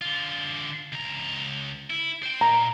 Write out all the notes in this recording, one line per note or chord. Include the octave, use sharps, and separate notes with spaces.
D3 F4
C#2 A#5
E4
C5 G5
A#2 A#5